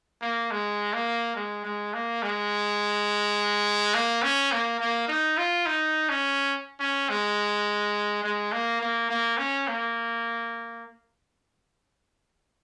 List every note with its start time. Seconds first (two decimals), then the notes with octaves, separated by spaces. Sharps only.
0.22 A#3
0.51 G#3
0.93 A#3
1.36 G#3
1.64 G#3
1.94 A#3
2.22 G#3
3.94 A#3
4.23 C#4
4.52 A#3
4.80 A#3
5.08 D#4
5.38 F4
5.66 D#4
6.09 C#4
6.80 C#4
7.09 G#3
8.24 G#3
8.52 A#3
8.81 A#3
9.10 A#3
9.37 C#4
9.67 A#3